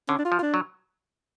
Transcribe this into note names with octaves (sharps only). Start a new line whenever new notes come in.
D3 C#4
D4
F4
F3
F4
D4
F#3